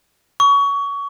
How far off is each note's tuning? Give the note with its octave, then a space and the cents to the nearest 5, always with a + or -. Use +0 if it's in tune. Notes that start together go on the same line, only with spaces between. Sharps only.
C#6 +25